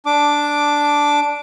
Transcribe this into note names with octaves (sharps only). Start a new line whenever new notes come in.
D4 D6